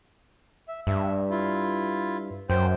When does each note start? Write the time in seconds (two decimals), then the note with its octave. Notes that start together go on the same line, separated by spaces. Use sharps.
0.68 E5
0.87 G2 E5
1.30 E4 F4
2.50 F#2 C5 G5